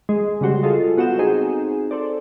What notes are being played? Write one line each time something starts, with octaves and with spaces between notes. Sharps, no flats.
G#3
C#3 G3 F#4 C5
G#3 F4 G#4 A4
B3 F#4 F#5 G6 E7
C4 D#4 G#4
A4 C5 D5